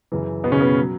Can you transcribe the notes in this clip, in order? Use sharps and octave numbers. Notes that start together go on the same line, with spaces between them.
F#2 C#3 E3
B2 B3
C#3 C#4
B2 B3
F#3